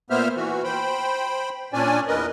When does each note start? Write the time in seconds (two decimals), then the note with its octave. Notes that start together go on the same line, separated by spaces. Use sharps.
0.10 A#2 A#3 B3 C5 E5 F6
0.36 E3 F#4
0.64 C5 G5 B5
1.73 A#2 C#4 D4 D5 G#5
2.08 E2 A#4 B4 D#5